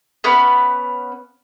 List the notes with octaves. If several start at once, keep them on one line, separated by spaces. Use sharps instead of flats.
B3 C#4 B4 F5